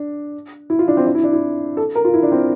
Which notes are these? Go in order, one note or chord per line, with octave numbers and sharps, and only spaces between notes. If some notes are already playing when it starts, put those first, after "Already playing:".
Already playing: D4
E4
F4
D4
C4
D4
E4
D4
E4
A4
A#4
F4
E4
D4
C4